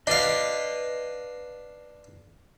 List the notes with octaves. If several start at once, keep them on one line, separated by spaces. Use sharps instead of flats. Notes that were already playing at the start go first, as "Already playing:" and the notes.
D4 B4 D#5 F5